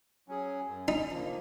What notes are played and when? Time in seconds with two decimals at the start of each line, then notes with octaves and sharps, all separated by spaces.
0.28 F#3 C#4 G#4
0.68 F#2
0.88 D#4
1.09 F3 A#3